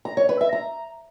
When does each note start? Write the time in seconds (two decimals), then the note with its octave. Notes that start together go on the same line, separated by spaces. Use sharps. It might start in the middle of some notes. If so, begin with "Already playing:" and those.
0.05 A#5
0.17 C#5
0.29 B4
0.41 E5
0.53 A#5